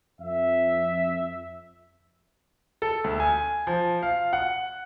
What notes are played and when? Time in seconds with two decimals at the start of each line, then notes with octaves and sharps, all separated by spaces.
0.21 F2 E5
2.82 A4
3.04 D2
3.20 G#5
3.67 F3
4.02 F5
4.33 F#5